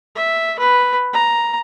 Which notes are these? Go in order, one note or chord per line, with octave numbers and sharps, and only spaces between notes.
E5
B4
A#5